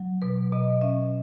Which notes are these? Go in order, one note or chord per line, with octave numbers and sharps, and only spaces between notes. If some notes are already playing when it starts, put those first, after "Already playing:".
Already playing: F#3
B2 B4
B2 D#5
C#4 E5